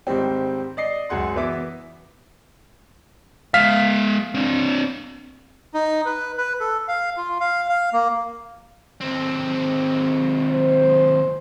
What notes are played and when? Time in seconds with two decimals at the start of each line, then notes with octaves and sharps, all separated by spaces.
0.07 G#2 D#3 G3 C4
0.77 D5 D#5 C7
1.09 C#2 F#2 G#4 F#5 C6
1.36 E3 B3 F#4 E5 D6
3.54 G#3 E5 F5 F6 B6
4.35 C4 D4
5.74 D#4
6.05 B4
6.38 B4
6.60 A4
6.88 F5
7.17 F4
7.40 F5
7.69 F5
7.93 A#3
9.01 D#2 C4
10.50 C5